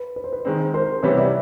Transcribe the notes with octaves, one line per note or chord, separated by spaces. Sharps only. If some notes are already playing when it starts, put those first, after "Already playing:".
Already playing: B4
B4
C5
B4
D#3 G#3 C4
A#4 C5
C3 E3 G3 B3 B4 C#5
D5 E5